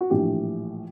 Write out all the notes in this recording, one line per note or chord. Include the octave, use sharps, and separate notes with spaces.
F#4
A#1 A2 E3 G4